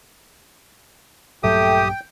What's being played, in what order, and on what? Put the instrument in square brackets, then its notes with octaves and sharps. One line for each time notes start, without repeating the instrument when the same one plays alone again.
[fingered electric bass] A#1 G2 F#3 [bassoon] A3 [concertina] G4 D#6 [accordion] G5